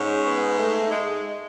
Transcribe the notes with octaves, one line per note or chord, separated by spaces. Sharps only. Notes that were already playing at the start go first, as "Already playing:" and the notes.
Already playing: G#2 G#3 C#4
B3
A3
G#3